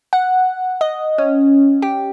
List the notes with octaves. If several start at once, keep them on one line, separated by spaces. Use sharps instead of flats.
F#5
D#5
C#4
G4